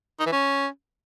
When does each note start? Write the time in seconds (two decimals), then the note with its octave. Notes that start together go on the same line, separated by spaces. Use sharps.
0.20 D#4
0.26 E3
0.32 C#4